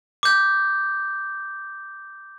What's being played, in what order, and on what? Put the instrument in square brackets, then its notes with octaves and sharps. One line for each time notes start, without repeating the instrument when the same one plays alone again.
[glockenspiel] D6 G6